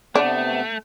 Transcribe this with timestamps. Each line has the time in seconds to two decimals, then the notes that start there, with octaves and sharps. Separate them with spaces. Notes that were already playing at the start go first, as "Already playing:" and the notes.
0.15 C3 A3 B3 D4